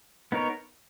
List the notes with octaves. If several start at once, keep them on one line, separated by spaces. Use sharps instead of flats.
B3 D#4 A#4 C#5